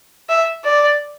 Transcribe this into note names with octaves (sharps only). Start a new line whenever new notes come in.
E5
D5